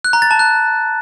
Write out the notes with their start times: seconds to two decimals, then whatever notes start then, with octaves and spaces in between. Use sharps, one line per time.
0.05 F#6
0.13 A#5
0.22 A6
0.31 A5
0.39 F#6